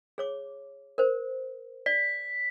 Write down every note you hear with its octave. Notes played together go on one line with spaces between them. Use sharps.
G#4 C#5 D6
A#4 C5
D5 B6